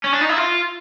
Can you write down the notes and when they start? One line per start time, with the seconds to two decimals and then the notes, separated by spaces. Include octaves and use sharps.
0.04 C#4
0.12 D4
0.21 D#4
0.29 E4
0.37 F4